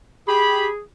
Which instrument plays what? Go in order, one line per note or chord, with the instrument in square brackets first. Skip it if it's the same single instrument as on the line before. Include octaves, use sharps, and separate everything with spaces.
[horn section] G4 B5 [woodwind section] G#4